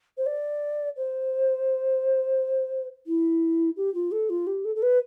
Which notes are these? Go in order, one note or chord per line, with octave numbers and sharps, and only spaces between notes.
C5
D5
C5
E4
G4
F4
A4
F4
G4
A4
A4
B4